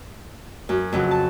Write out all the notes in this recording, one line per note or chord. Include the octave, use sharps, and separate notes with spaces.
F#2
F2 C#3 F#3
A5